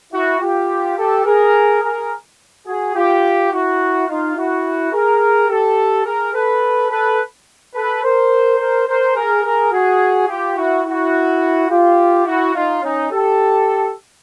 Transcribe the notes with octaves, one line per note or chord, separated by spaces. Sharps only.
E4 F#4
F4 G4
G4 A4
G#4 A#4
G#4 A#4
F#4 G#4
F4 G4
E4 F#4
D#4 F4
E4 F#4
G#4 A#4
G4 A4
G#4 A#4
A4 B4
A4 B4
A4 B4
A#4 C5
A#4 C5
A#4 C5
G#4 A#4
G#4 A#4
F#4 G#4
F4 G4
E4 F#4
E4 F#4
F4 G4
E4 F#4
D#4 F4
C#4 D#4
G4 A4